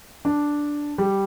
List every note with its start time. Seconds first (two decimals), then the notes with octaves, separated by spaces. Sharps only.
0.25 D4
0.98 G3